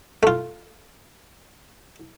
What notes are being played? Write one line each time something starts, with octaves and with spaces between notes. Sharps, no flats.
A3 F4